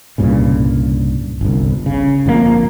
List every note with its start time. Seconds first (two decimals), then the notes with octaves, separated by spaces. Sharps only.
0.18 C2 G2 A#2 C#3
1.41 G1 C2
1.86 C#3
2.26 G1 F2 A2 A#3